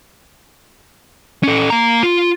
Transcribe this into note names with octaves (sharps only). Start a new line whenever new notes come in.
C#4 A4
A#3 A#5
F4